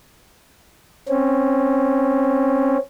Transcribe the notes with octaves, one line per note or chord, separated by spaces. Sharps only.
C4 C#4